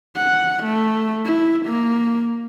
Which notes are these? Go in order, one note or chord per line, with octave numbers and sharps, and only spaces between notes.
F#5
A3
E4
A#3